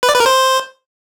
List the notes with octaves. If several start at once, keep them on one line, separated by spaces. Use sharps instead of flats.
B4
D5
B4
A#4
C5